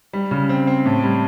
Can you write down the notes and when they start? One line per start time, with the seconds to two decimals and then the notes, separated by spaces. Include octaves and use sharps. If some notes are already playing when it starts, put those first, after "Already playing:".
0.13 G3
0.31 C#3
0.49 C4
0.67 C4
0.85 A2
1.04 G3